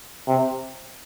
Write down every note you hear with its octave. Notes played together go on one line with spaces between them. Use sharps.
C3